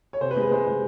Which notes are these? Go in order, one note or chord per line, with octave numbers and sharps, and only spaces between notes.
C#5
C3 C5
B4
G#3
B4
G#3 C5
G#3